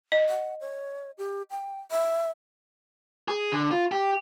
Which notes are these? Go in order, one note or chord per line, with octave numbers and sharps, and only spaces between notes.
D#5
F#5
C#5
G4
G5
E5
G#4
D3
F4
G4